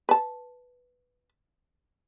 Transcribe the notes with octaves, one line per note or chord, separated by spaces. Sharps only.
B4 A5